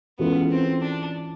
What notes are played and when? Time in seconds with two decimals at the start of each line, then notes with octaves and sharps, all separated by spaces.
0.19 E3 G#3 B3 C#4 F4 A4
0.50 C4
0.82 D4